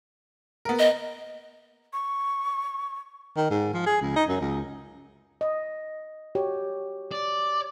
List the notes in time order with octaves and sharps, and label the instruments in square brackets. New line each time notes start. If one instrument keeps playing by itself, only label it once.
[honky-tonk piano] B3 A#4
[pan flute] D#5
[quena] C#6
[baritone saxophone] D#3
G#2
F3
G#4
C#2
D#4
F#2
C#2
[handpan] D#5
F#4 G4 C#5
[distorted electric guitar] D5